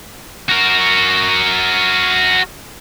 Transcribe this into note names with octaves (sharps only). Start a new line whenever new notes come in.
F#4 A#4